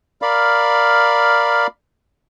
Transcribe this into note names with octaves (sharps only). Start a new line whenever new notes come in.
A#4 D5 F5 B5